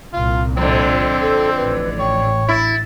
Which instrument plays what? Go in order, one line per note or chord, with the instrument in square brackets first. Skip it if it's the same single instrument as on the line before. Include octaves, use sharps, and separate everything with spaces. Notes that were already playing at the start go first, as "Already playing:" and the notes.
[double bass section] C2 A#2 [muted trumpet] F4
[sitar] F2 D3 [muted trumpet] C4
[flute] A4
[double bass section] A1 A2 [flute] B4
[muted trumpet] C#5 [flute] G5
[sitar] E4 [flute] A6